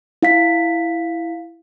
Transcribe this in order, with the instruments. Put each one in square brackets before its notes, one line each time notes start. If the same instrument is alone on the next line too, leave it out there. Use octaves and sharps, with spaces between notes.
[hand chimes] E4 F5 B6